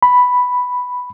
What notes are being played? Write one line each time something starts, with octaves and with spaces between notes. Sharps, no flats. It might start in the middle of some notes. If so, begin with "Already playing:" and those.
B5